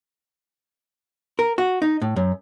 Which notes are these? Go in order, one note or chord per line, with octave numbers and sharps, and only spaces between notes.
A#4
F#4
D#4
A2
F#2